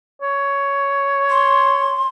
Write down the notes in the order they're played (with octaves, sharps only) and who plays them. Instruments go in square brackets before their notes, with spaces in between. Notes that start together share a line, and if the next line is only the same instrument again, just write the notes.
[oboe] C#5
[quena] C6